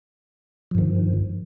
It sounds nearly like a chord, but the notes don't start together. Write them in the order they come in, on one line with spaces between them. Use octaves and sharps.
F3 G2 D#3